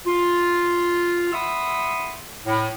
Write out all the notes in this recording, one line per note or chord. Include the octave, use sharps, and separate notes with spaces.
F4
E5 F#5 B5 C6 D#6 E6
A2